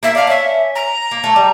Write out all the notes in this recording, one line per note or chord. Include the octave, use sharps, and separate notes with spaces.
A#3 E5
D4 F5
C#4 E5
A#5
A#3
A3
G3